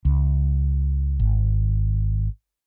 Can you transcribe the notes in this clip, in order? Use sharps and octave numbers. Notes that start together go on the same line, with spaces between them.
C#2
G#1